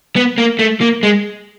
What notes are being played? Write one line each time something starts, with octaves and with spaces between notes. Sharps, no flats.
B3
A#3
A3
A#3
G#3